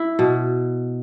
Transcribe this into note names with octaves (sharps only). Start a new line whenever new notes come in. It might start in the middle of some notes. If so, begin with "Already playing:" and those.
Already playing: E4
B2